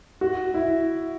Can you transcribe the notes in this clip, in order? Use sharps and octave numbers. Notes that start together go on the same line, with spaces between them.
F#4
E4